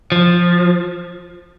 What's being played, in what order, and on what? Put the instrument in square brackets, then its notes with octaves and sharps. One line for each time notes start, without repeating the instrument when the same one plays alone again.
[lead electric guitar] F3